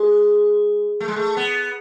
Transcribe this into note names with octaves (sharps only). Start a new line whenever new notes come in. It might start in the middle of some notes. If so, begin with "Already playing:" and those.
Already playing: G#3
A3
G#3
A3
B3